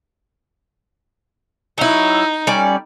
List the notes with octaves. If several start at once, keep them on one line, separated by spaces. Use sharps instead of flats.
F#3 D#4 E4
G3 C#4 D5